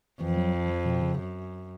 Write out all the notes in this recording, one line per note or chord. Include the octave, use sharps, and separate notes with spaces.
F2 E3
F#3
F3
F3
B2
C#3
F#2